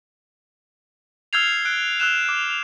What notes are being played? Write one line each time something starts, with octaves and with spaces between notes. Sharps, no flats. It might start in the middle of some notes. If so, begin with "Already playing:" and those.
E6 F6 G6 G#6 C7 F7
F#6 D7
E6 F#6 E7
D6